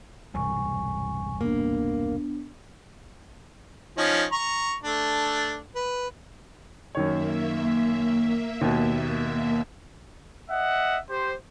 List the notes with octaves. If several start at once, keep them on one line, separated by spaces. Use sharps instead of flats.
E1 C2 G2 G#5 C#6
A#3 B3 D4
F3 C#4 D#4
A#5 C#6
A3 D4
B4
F#2 D#3 A#3 C#5 E5
D#2 B2
D#5 E5 F#5
G4 C5